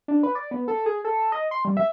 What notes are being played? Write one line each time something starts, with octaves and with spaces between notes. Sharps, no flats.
D4
B4
D5
B3
A4
G#4
A4
D#5
C6
G3
E5